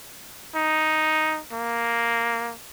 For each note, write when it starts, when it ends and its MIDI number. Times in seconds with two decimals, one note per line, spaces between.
0.55 1.40 63
1.53 2.53 58